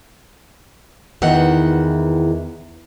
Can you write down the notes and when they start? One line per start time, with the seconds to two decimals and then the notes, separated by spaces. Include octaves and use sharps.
1.22 E2 D#3 E3 F#5